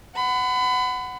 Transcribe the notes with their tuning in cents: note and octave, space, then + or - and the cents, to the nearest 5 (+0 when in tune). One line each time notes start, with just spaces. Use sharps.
F#5 +0 B5 +35